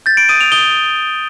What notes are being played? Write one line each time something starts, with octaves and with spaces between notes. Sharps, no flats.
G6 A6
D7
D#6 D#7
F7
D#6 G7